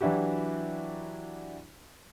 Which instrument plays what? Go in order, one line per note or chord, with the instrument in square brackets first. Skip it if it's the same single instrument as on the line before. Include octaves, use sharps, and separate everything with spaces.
[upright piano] E3 F#3 D4 E4 F#4 G4